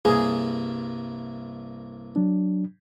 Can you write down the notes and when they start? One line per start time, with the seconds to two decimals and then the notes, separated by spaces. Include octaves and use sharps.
0.05 C2 G2 A#3 G#4
2.16 F#3 D4